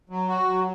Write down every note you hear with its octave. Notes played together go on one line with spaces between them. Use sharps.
F#3
F#4
F#3